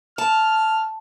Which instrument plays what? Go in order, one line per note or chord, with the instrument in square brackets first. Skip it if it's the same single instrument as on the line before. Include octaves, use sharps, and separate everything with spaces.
[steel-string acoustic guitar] A5 [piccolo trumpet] F6